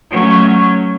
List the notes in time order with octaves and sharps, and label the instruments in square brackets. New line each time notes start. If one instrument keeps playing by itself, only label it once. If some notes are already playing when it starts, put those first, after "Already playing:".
[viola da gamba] F#3 A3 C#4